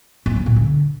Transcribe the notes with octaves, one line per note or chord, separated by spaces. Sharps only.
C4
F#3
A#2
D3